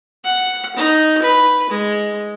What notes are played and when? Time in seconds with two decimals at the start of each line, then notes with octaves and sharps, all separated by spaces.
0.25 F#5
0.76 D#4
1.22 B4
1.70 G#3